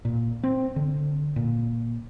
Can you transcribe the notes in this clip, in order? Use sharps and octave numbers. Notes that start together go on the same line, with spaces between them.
A#2
C4
D3
A#2